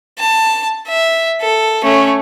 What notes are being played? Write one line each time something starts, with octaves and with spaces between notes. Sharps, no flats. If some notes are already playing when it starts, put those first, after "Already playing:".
A5
E5
A4
A3 C#4